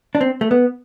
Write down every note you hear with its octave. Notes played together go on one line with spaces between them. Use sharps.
D4
C4
A3
B3